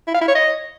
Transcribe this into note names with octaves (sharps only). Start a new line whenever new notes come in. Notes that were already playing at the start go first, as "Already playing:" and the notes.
E4
F5
E4
C#5
D#5